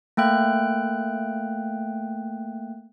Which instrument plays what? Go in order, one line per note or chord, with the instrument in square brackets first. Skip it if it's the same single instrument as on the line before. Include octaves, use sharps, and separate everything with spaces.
[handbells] A3 A#3 G5 F#6